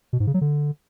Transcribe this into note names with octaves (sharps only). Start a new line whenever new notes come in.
B2
G#2
C#3
F#3
D3